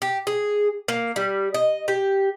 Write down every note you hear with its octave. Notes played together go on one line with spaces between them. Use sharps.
G4
G#4
A#3
G3
D#5
G4